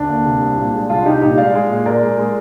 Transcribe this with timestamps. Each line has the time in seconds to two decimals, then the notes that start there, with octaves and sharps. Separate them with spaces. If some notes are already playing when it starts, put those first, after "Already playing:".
Already playing: D2 D4
0.09 A#3
0.25 C3
0.41 C2
0.57 A#2
0.73 G#3
0.89 C2 D4 F4
1.06 C2 D#4 G4
1.21 A#2 D#4 G4
1.38 G#3 D5 F5
1.54 G#3
1.70 A#2
1.86 A#2 A#4 D5
2.02 G#3
2.18 G#3